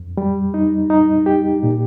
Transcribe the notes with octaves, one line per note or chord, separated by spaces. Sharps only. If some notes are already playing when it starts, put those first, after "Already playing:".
Already playing: F2
G3
D#4
D#4
G4
A#2